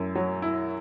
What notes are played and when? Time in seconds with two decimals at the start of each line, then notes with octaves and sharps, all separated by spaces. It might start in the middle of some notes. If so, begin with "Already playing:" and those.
Already playing: F#2 E4
0.15 F#3
0.42 E4